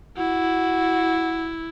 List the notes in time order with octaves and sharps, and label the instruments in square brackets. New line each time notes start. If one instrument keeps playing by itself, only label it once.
[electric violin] E4 [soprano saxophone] F#4